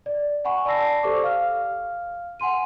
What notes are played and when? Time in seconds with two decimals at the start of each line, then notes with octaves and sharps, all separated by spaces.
0.06 D5
0.45 F#5 G#5 B5 C#6
0.65 D5 A5 B5 E6 A#6 C7
1.03 G4 A4 C5 D5 C#6 D6
1.23 F5 F6
2.40 F#5 G#5 C6 D#7